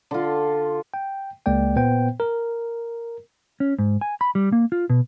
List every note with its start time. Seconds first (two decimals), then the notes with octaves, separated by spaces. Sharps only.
0.11 D3 F4
0.94 G5
1.46 C#2 G#3 A#3 D5 G5
1.76 A#2 B3 C5 G5
2.20 A#4
3.60 C#4
3.79 G#2
4.01 G#5
4.21 B5
4.35 G3
4.52 A#3
4.72 F4
4.90 B2